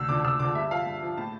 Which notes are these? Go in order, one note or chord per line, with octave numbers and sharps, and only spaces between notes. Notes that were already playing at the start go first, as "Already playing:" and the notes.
Already playing: D2 E6
D3 F3 D6
D2 E6
D3 F3 D6
G2 E5
F3 F5
G2
F3
A2 A5